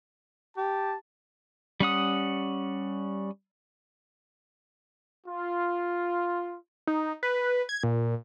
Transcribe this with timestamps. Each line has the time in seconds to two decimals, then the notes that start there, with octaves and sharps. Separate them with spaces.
0.57 G4 A5
1.80 G3 C#4 F#5 D#6
5.26 F4
6.87 D#4
7.23 B4
7.69 G#6
7.83 A#2